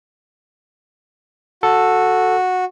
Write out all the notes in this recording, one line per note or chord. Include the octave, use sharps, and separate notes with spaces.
F#4 A4